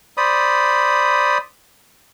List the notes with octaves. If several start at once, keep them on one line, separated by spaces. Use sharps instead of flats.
C5 D5 B5 D#6